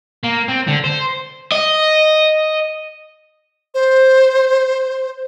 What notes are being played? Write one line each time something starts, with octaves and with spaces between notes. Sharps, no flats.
A#3
C4
D3
C5
D#5
C5